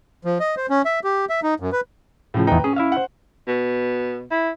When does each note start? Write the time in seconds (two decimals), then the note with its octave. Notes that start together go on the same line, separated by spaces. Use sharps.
0.25 F3
0.40 D#5
0.57 C5
0.70 C#4
0.85 E5
1.04 G4
1.29 E5
1.43 D#4
1.60 F#2
1.72 B4
2.34 A2 C#3 F3
2.47 E2 D#4 B4 G5 A#5
2.64 C#4 G#4
2.76 E4 E5 F5
2.92 C5 F#5
3.48 B2
4.31 E4